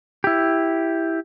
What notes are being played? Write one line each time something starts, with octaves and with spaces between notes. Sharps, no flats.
E4 G4